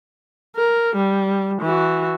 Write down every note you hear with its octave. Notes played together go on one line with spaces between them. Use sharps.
A#4
G3
E3 F#4